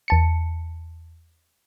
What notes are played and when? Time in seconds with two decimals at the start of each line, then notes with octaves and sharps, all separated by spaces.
0.08 E2 A5 C#7